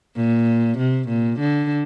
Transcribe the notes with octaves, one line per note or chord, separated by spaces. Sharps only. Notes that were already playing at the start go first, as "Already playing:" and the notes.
A#2
C3
A#2
D3